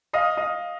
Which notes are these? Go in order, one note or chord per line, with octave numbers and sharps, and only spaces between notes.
D#5 F5
D#5 F5